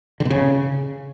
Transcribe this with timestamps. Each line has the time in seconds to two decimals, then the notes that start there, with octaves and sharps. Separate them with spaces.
0.20 D3
0.25 B2
0.30 C#3